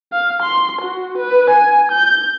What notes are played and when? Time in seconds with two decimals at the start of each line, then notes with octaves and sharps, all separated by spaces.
0.12 F5
0.42 C6
0.81 F#4
1.18 B4
1.50 G#5
1.92 G6